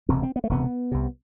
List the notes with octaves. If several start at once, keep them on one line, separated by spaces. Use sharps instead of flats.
E1 D2 C3 C4
C4
B3
A3
E1 D2 C3 B3
C2 C3